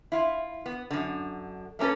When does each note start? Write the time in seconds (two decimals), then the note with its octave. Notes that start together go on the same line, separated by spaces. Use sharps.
0.12 E4 F4
0.66 B3
0.91 F#2 D3
1.79 A3 A#3 C#4 A4 B4